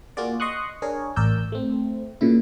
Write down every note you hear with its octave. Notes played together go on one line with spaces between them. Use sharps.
A#3 F4 F#4 G#4 D5
D#5 C6 C#6 D#6 F#6
D4 G#4 A#4 C#5
A1 A#4 D5 E6 G6
A3 C4
A#2 C#3 E4